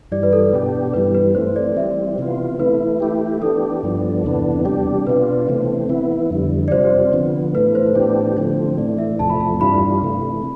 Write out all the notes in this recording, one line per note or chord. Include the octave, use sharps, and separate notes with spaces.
G2 E3 G3 D5
B4
A4
B2 B3 D4 G4
G2 E3 G3 B4
B4
E3 A3 C4 C5
D5
E3 G3 C4 E5
C3 E3 B3 F4
E3 A3 E4 B4
E3 A3 E4 G4
E3 B3 D4 G4 A4
G2 F3 B3 D4
E2 C3 E3 B3 D4
C3 G3 D4 G4
B2 B3 D4 F4 B4
C3 E3 A3 C4
E3 B3 E4
F2 D3 G3
D5
C3 G3 C4 F4 C5
D3 F3 B3
A2 E3 A3 B4
C5
A2 E3 B3 D4 G4
D3 F3 A3 C4
A2 E3 A3 D5
E5
E2 C3 F3 A3 A5
B5
A5
G2 E3 G3 D4 F4 B5
C3 E3 A3